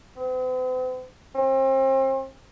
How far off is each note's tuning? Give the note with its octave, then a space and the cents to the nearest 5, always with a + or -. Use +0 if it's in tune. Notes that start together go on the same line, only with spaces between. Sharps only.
C4 -45
C4 +35